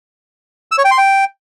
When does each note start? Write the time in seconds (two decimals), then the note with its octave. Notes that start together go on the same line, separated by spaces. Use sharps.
0.72 E6
0.78 C#5
0.85 G5
0.91 C6
0.98 G5